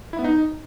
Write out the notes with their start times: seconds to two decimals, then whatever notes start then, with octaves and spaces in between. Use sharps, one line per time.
0.13 E4
0.19 B3
0.24 D#4